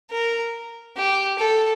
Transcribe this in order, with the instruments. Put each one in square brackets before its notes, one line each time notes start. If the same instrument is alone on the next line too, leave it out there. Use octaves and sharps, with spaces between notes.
[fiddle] A#4
G4
A4